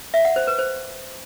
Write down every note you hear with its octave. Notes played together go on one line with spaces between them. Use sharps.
E5
F#5
C5
B4
C5